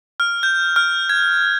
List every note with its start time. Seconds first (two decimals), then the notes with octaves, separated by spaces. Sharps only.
0.20 F6
0.43 G6
0.76 F6
1.09 G#6